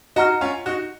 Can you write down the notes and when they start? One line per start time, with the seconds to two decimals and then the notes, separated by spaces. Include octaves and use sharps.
0.16 D#4 F#4 D#5 F#5 A#5 F6
0.41 C#4 F4
0.66 D#4 F#4